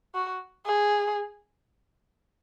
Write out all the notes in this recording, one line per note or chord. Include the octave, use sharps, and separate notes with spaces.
F#4
G#4